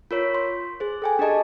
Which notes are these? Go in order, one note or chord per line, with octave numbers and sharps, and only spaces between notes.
F4 A#4 C#5 B6
C6
G#4 C5
A4 G5 G#5
D4 G4 G#4 D#5 A5